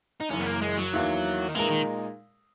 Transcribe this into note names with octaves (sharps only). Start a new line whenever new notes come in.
D#4
F#1 F#2 E3 C#4
B3
A#3
G#3
F#3
E2 D#3 A#3 E4
D#3
A#2 E3 G#3 D#4 A#4
D#3